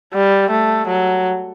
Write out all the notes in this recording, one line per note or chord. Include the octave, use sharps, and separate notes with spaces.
G3
A3
F#3